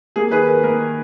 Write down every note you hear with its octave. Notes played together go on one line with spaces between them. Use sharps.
A#3 G#4
D#3 G#4 B4
D#3 A#4
A#3 A#4
D#3